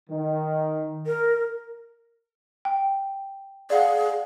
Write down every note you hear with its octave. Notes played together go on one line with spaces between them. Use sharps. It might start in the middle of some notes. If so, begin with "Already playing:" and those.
D#3
A#4
G5
G#4 D5 F5 F#5